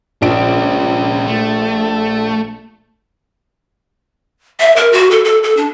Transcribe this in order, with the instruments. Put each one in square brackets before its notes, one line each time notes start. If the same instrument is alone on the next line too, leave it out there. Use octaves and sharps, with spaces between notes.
[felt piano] A#1 D7 [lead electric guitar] C#4 F4
[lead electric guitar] A3
[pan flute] E5
A#4
F#4
A4
A4
A4
D4